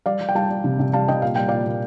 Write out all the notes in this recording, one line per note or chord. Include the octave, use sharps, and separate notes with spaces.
G3 D5 F5
G3
G5
G3 F5 A5
G3
C3
C3
G3 F5 A5
C3 D#5 G5
A#2 F5
G3 G5
A#2 D5 F5
A#2